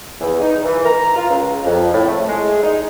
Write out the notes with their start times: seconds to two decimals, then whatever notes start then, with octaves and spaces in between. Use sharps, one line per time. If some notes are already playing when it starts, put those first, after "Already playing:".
0.21 E2
0.40 D#4
0.65 E3
0.85 A#5
1.16 F4
1.29 C#2
1.64 F2
1.93 A2
2.07 A3
2.28 G#3
2.62 D#4